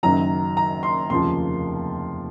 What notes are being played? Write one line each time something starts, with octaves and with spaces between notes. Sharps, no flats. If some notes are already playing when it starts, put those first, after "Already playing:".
F#1 F#2 D#3 F#3 A#5
A#5
C6
F1 D#2 C#3 F3 A#3 C6